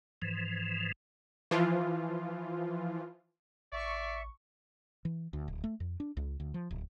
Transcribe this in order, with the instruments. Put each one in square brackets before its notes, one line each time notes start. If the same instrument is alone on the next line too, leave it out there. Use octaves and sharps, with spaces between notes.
[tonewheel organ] G#2 E3 F3
[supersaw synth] E3 F3 F4
[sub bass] A1 [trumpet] D5 [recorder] E5 [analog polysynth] C#6
[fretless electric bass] E3
D2
D1
A3
F2
D4
C#2
D2
F3
D1